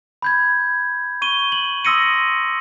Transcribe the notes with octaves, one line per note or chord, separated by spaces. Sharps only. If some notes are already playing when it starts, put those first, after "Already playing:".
B5 G6 G#6
C#6 D#7 G7
F#7
C6 D#6 E6 A#6 C#7 D#7